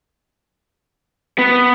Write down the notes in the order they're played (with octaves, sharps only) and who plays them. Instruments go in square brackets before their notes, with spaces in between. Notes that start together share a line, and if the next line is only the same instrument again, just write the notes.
[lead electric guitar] B3